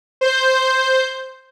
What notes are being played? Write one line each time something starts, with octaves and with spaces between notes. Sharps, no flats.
C5 G6